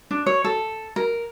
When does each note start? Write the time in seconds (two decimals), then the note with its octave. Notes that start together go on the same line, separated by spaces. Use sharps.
0.11 D4
0.26 C#5
0.44 A4
0.96 A#4